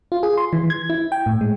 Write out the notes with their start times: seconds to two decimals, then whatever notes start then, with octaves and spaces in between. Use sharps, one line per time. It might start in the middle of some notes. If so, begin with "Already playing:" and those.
0.12 F4
0.23 G#4
0.37 C6
0.53 E3
0.70 G#6
0.90 E4
1.12 G5
1.26 A2
1.41 G#3